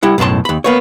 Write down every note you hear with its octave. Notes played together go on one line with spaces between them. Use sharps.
G3 E4 F#5
B1 F#2 A2 A5 C6
D#2 B5
A#3 B3 C#5